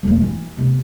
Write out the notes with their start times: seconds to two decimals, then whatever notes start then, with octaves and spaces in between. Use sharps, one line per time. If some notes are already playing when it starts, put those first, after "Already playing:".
0.03 E1 A#3
0.22 E3
0.57 C3 B3